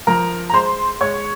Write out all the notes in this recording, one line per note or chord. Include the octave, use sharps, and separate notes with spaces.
F3 A#4 A#5
A#5
G#3 C5 C6
G#3 C#5 C#6